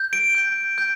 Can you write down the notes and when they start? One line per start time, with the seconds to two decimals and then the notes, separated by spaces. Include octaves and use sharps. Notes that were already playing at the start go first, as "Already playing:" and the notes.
Already playing: G6
0.13 D7
0.35 G6
0.78 G6